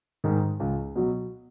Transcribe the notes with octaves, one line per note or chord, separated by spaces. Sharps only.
G#2 D#3
C#2
B2 F#3